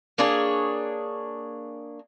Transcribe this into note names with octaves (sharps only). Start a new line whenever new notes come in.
A#3 D4 G#4 C#5